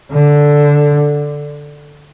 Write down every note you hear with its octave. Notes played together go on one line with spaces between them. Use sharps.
D3